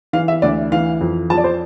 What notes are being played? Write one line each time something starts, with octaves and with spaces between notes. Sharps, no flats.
E3 F5
E5
D2 D5
E3 F5
F2
F3 A5
D5
C5